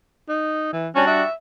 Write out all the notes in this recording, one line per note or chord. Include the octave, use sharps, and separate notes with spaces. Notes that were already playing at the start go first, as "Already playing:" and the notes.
D#4
E3
G3 C#4 D4 F#4
E5